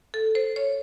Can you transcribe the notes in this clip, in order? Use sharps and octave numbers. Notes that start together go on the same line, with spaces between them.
A4
C5
C#5